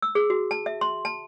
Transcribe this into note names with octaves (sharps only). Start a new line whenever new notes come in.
E6
G#4
F#4
A5
E5
C6
A5